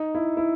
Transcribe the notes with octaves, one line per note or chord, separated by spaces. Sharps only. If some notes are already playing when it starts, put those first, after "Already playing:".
Already playing: D#4
E4
E4